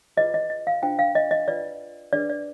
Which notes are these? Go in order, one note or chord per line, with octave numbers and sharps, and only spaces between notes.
F4 G#4 B4 D#5
D#5
D#5
F5
D4 F4 C5 G5
F5
D#5
D#5
F4 B4 D5
D4 G#4 B4 D5
D5